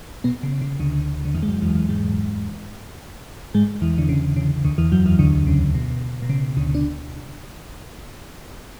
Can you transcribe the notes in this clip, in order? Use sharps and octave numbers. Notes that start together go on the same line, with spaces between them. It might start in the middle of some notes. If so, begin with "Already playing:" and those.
B2 B3
C#3
C#3
D2 D3
D3
E2 E3
G#3
F#2 F#3
E2 E3
E2 E3
G#2 G#3
G#2 G#3
E2 E3
D3
C#3
C#3
D2 D3
E2 E3
F#2 F#3
E2 E3
D2 D3
C#3
B2
B2
C#3
D2 D3
D4